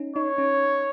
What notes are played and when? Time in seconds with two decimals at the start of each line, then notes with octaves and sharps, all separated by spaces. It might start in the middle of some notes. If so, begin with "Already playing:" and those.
Already playing: C#4 D#4
0.16 D#4 C#5
0.38 C#4